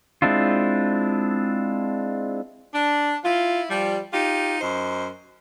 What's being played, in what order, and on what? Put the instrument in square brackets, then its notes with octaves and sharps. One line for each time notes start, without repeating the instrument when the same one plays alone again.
[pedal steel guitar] G#3 C4 D4 E4 F4
[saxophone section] D4
E4 F4
F3 G3
D#4 F4 G4
F#2 C5 D#5